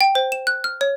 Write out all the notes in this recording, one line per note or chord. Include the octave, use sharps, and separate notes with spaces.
G5
C5
E7
F#6
F6
C#5